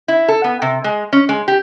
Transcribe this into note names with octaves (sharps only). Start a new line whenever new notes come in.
E4
A4
B3
C3
G#3
C#4
G#3
G4